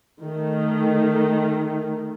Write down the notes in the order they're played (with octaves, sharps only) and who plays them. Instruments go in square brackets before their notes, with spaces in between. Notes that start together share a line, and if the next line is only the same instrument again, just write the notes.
[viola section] D#3 A3